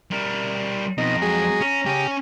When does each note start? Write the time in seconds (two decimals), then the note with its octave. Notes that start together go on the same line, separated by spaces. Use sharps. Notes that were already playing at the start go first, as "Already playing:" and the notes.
0.11 G3 A#4
0.98 F2 B2 D#4 A#5
1.22 F#3 G#3 G#4
1.61 C#4
1.86 C#3 C#4 G4